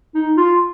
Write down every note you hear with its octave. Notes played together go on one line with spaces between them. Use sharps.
D#4
F4